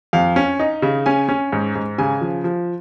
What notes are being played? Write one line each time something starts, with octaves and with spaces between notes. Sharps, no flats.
F2 F5
C#4
D#4
C#3
C#4 G#5
C#4
G#2
G#2
C#3 G#5
F3
F3